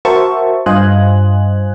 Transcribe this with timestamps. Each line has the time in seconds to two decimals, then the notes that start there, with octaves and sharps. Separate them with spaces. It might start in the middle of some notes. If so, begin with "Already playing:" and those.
0.05 F#4 A#4 C5 E5 A5 C#6
0.66 G2 F4 C5 D#5 G#5 F#6